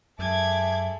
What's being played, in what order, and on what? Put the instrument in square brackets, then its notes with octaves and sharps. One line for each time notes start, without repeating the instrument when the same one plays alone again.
[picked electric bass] F#2 [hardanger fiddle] G#3 A4 [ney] E5 [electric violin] D6 G#6